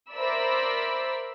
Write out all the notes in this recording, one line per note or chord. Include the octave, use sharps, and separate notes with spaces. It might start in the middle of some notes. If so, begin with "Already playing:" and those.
A#4 C5 D5 E5 B5 E6